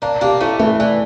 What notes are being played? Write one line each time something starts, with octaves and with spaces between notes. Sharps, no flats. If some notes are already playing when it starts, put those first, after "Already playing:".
A#3 D4 D5
A#3 D4 G4
A3 C#4 E4
E3 A3
E3 D5